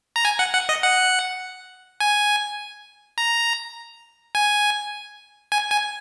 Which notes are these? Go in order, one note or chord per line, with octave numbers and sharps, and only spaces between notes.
A#5
G#5
F#5
F#5
D#5
F#5
G#5
A#5
G#5
G#5
G#5